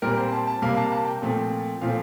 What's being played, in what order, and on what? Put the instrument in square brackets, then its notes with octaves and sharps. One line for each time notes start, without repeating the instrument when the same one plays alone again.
[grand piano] A#2 G3 C4 A#4
C5
A5
A5
C3 G3 A#3 F5
A5
A5
G5
A#2 F3 A3 C4
A#2 F3 A3 C4 F5